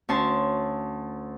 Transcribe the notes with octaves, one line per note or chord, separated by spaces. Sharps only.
D2 C#4 C#5 A5 C6